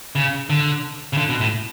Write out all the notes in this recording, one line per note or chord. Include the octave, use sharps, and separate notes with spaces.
C#3
D3
C#3
D3
B2
A2